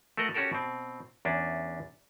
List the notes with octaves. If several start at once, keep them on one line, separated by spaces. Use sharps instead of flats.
A3 F#4 A#4 D#5 F#5
C#4 F#4 G4 A4 A#4
B2 C4
E2 C#4 D4